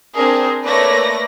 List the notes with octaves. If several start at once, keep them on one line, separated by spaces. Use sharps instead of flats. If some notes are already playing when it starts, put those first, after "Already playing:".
C4 D4 G#4 A#4
A3 A#3 B4 C#5 D5 A#6